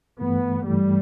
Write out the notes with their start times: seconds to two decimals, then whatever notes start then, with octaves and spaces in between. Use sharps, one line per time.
0.21 G2 E3 A3 B3
0.67 G2 E3 G3 A3